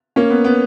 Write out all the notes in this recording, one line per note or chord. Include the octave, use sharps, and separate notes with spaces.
A#3 C#4
B3
B3